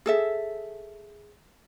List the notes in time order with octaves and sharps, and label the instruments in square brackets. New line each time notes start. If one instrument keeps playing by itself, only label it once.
[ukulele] G#4 A4 E5